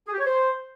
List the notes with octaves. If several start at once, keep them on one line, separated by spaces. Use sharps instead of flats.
G#4
G4
C#5
C5